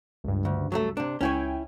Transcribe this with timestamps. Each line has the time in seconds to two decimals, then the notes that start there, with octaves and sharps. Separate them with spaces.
0.24 C#2 G2
0.45 D2
0.72 F#3 G#3 A3
0.97 C3 D4
1.21 C#2 C#4 E4 C#5 G5 G#5